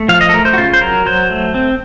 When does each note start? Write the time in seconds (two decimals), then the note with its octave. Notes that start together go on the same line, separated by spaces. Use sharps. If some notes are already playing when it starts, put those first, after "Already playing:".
Already playing: A3
0.08 F3 F5
0.21 D#5
0.29 A4
0.34 A3 A#4
0.45 C5
0.53 F#4
0.58 C#3 F4
0.74 C5
0.81 F#3 A#4
1.06 F#3 C5
1.30 A3
1.54 C4